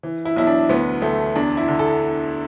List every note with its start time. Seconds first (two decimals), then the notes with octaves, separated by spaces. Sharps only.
0.03 E3
0.25 E4
0.36 B1 E4
0.47 D4
0.69 D2 B3
1.02 D2 A3
1.36 E2 D4
1.57 E4
1.68 D3
1.79 A4